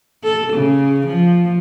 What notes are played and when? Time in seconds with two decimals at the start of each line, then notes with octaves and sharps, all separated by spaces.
0.23 A4
0.53 C#3
1.07 F3